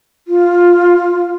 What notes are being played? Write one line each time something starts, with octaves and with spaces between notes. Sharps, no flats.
F4